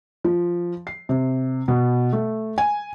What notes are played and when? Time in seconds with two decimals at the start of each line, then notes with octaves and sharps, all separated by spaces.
0.24 F3
0.87 C7
1.09 C3
1.68 B2
2.13 A3
2.58 G#5